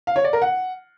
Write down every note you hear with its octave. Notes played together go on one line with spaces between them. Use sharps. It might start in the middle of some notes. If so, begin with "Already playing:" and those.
F5
C#5
D5
A#4
F#5